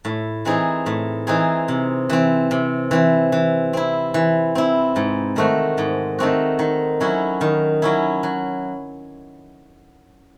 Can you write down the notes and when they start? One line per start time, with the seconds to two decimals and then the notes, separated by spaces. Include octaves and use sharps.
0.05 A2
0.45 E3 C4 D#4 G#4
0.86 A2
1.27 E3 C4 D#4 G#4
1.68 C3
2.09 E3 C4
2.51 C3
2.91 E3 C4
3.32 E3
3.73 C4 E4
4.14 E3
4.55 C4 E4
4.96 G#2
5.36 D#3 A3 C4 F#4
5.78 G#2
6.19 D#3 A3 C4 F#4
6.59 D#3
7.01 F#3 C#4 E4
7.41 D#3
7.82 F#3 C#4 E4
8.23 F#3